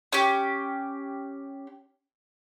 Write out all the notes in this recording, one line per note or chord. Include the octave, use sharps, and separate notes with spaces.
C#4 G4